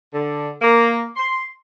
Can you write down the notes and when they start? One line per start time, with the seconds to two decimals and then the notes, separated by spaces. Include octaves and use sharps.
0.13 D3
0.62 A#3
1.16 C6